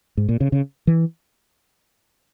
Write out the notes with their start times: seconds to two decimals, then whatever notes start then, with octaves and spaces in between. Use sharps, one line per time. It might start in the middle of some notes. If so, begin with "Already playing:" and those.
0.17 G#2
0.29 A#2
0.41 C#3
0.52 C#3
0.87 E3